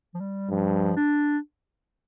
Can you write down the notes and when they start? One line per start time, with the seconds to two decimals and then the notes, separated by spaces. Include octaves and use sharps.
0.14 F3
0.20 G3
0.50 G2 F3
0.96 D4